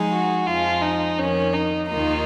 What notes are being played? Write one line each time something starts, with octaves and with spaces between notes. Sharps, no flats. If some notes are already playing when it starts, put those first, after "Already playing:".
Already playing: F3 G#3 D#4 G#4
F#4
F2 F3 G#3 F4
D#4
F2 D#3 A#3 C#4
D#4
D#2 D#3 A#3 D#4 F4